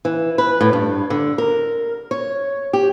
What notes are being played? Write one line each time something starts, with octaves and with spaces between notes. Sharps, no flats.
E3
B4
A2
G2
D3
A#4
C#5
G4